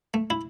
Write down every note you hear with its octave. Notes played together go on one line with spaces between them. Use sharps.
A3
E4